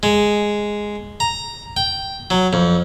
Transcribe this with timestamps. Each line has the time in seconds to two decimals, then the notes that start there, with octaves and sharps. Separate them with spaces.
0.03 G#3
1.20 A#5
1.77 G5
2.30 F#3
2.53 F2